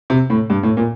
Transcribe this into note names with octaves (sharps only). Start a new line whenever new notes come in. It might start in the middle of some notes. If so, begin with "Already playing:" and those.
C3
A2
G2
A2
A#2